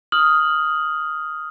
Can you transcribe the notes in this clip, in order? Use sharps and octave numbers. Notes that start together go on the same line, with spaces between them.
D#6 F6 F#7